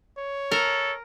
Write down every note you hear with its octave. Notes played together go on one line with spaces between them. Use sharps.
C#5
A4 A#4